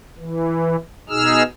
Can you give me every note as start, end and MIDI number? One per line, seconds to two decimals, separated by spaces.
0.18 0.76 52
1.09 1.43 47
1.09 1.43 63
1.09 1.43 68
1.09 1.43 88
1.09 1.43 89